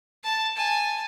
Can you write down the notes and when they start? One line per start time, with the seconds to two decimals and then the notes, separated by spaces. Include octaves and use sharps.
0.23 A5
0.56 G#5 A5